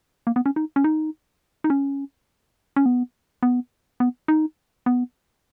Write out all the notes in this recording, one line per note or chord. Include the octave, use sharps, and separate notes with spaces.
A#3
B3
C#4
D#4
C#4
D#4
D#4
C#4
C#4
B3
B3
B3
D#4
B3